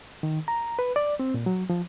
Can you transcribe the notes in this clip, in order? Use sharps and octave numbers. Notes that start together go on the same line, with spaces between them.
D#3
A#5
B4
D5
C4
A#2
F#3
F3